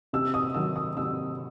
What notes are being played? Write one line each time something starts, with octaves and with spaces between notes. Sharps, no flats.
C3 E6
D#6
D#3 F#3 E6
D#6
C3 E6